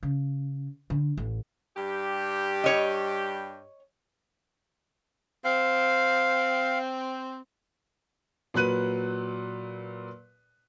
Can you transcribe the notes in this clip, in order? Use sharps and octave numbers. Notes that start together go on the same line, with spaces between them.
C#3
D3
A1
G2 G3 G4
C#5 D#5
C4 F5
A#2 F#3 B4 F#6 D#7